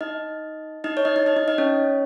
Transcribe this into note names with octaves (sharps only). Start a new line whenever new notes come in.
D#4 D#5
D#4 D#5
C#5
D#4 D#5
D#4 D#5
D#4 D#5
D#4 D#5
D#4 D#5
C#4 C#5